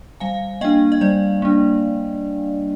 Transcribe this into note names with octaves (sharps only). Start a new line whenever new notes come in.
G3 F5 G#5
A#3 D4 D#5 G5
D#5
G3 D5
A#3 D4